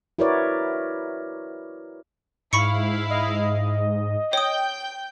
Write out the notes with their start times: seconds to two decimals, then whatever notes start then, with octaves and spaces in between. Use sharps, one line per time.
0.18 E4 F#4 A#4 B4 C#5 D5
2.53 G#2 E4 F5 B5 C#6 C#7
3.10 D#5
4.33 C#5 G5 D#6 G6